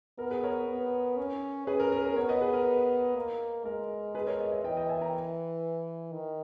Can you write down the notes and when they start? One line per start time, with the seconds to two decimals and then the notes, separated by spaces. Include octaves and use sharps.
0.18 B3 A#4
0.31 G#4 B4
0.43 A#4 C#5
0.68 B3
1.17 C#4
1.67 C#4 G#4 B4
1.80 A#4
1.92 A#4
2.04 A#4
2.16 B3 A#4 C#5
2.29 B4 D#5
2.41 G#4 B4
2.54 A#4
3.15 A#3
3.65 G#3 A#4
4.15 G#4 B4
4.27 A#4 C#5
4.39 B4 D#5
4.52 C#5 E5
4.64 E3 D#5 G5
4.77 D#5 G5
4.89 E5 G#5
5.01 G5 A#5
6.13 D#3